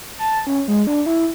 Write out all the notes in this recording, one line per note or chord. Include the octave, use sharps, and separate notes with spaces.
A5
C#4
G#3
D4
E4